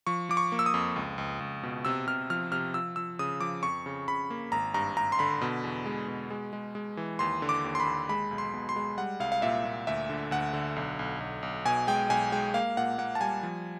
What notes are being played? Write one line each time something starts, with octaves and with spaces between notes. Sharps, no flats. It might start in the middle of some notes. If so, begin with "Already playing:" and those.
F3 C#6
F3 D6
C#6
A#3
E6
D#6
F2
C#2
C#2
C#2
B2
C3 E6
C3 F6
F3 F6
C3 F6
F3 E6
F3 E6
C#3 D#6
F3 D6
F2 C#6
C#3
C#3 B5
A#3
G#1 A#5
G2 A#5
G2 A#5
C6
D3 B5
B2
E2
G#3
B2
G#3
G#3
G#3
E3
D#2 C6
D3
D6
D#2
C6
B5
D#2
G#3 B5
B1
C6
B2
C6
G#3
G3 F#5
C2 F5
F5
A#2 E5
A#2
D2 E5
D3
D2 F#5
D3
B1
B1
B1
B1
B2 G#5
G#3 G5
B1 G#5
G#3 G5
A#3 F5
A#2 F#5
A#3 F#5
A5
G3 G#5
F3